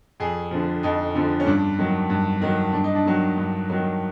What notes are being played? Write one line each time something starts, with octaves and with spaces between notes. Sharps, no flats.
F2 G#4
D3 F3
F2 D#4
D3 F3
C#4
G2 D4
D#3 F#3
G2
D#3 F#3
G2 D4
D#4
D4
D#3 F#3
G2
D#3 F#3